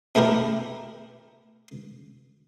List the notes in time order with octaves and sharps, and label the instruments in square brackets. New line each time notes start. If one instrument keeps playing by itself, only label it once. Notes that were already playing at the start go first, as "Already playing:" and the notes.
[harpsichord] B2 A3 E4 G4 A#4